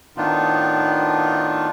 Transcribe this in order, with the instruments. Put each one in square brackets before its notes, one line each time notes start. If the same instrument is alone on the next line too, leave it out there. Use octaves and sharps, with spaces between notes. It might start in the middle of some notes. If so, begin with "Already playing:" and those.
[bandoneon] A2 D#3 B3 D4 D#4 F4